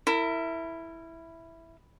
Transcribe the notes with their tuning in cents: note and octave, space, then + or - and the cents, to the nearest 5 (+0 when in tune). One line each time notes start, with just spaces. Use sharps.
E4 +0 A#4 -35